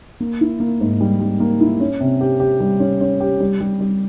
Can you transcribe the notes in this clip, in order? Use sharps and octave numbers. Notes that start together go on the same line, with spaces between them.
A#3
E4
A#3
G#2
G3
G3
A#3
E4
C#4
C3
G4
G4
G3
C#4
C#4
G4
G3
G3
G3